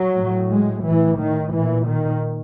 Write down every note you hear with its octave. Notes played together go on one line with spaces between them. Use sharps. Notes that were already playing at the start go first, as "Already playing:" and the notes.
Already playing: F#3
A2
G#3
A2 E3
D#3
A#2 E3
D#3